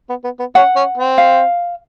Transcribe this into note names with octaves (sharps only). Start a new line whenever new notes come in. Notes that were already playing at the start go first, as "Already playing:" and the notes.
B3
B3
B3
C#4 F#5
C#4
C4
F5